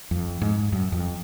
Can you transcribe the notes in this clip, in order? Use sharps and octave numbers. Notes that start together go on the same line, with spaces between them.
F2
G#2
F#2
F2